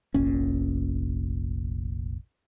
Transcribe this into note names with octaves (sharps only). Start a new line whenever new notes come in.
F1 A#1 A#2 C#4